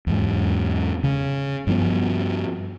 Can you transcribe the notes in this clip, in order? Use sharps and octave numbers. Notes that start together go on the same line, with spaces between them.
E2 G#2
C#3
G2 F3 B3